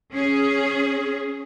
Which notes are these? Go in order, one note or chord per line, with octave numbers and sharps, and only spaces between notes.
C#4 G#4